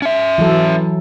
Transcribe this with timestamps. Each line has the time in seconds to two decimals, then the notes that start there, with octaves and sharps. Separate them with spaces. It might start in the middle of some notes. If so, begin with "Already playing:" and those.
0.02 C#4 E5
0.38 E3 F#3 A4